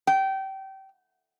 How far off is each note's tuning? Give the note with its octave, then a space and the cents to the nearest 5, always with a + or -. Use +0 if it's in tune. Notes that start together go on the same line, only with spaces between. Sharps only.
G5 -25